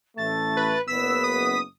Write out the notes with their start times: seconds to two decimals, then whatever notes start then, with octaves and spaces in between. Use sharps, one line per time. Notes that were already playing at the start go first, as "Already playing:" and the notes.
0.17 A1 A3 A6
0.57 B4
0.88 F#1 B3 E6 B6
1.24 D#6